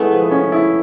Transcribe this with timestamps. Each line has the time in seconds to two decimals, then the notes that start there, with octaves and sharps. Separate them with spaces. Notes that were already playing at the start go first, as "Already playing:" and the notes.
Already playing: G#3 A3 B3 E4
0.11 F3
0.31 C#4
0.52 E4